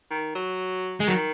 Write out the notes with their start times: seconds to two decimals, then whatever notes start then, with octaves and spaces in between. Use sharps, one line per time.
0.11 D#3
0.35 F#3
1.00 G#3
1.07 D#3 F#3